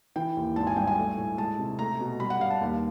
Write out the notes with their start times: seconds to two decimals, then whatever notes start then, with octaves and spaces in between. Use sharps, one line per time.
0.16 E3 G5
0.37 D#2
0.56 G#1 A5
0.67 G#5
0.76 G2 G5
0.87 G#5
0.98 A3
1.17 A2
1.38 G#3 A5
1.59 C3
1.79 A3 A#5
2.00 B2
2.20 G3 B5
2.30 F#5
2.40 G2 F5
2.51 A5
2.61 D#2